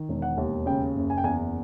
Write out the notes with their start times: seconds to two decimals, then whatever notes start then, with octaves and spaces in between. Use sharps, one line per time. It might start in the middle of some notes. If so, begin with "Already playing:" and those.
Already playing: D#3
0.09 E1
0.22 F#5
0.38 D#2
0.66 C#3 G5
0.96 F#1
1.10 G#5
1.18 G5
1.24 E2 G#5